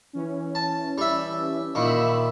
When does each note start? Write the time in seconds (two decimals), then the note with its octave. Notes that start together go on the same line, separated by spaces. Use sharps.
0.13 E3 C#4
0.55 A5
0.98 G3 E5
1.75 A#2 D#3 E5 B5 E6